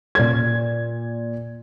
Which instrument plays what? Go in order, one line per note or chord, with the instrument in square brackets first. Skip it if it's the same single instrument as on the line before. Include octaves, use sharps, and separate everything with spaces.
[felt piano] A#2 G#6